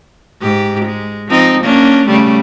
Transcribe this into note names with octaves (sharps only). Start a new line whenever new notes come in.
G#2 G4
G#3
F3 C4 D#4
A#3 C#4 D4
C#3 G3 A3